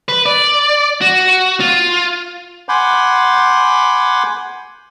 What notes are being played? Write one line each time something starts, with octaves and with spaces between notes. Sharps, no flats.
B4
D5
F#4
F4
F#5 G#5 B5 C6 D6 G6